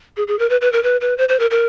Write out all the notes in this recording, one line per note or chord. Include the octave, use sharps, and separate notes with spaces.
G#4
G#4
A#4
B4
B4
A#4
B4
B4
C5
C5
A#4
A#4